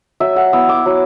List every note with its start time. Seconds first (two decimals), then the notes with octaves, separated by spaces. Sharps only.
0.20 F#3 E5
0.36 F#5
0.53 B3 E4 E6
0.69 D6
0.86 F#3